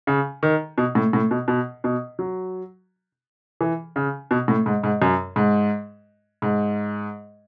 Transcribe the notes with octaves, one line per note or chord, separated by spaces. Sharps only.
C#3
D#3
B2
A2
A2
B2
B2
B2
F#3
E3
C#3
B2
A2
G#2
G#2
F#2
G#2
G#2